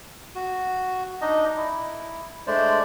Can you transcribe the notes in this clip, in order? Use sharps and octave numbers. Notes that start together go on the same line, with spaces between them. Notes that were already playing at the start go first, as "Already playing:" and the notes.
F#4
D4 D#4 D#5
E4
G#3 A3 D4 C5 D5